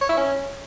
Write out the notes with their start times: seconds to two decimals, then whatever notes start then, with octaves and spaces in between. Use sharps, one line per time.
0.01 C#5
0.09 E4
0.17 C#4